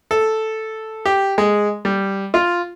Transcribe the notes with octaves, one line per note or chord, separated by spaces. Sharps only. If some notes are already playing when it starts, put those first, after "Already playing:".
A4
G4
G#3
G3
F4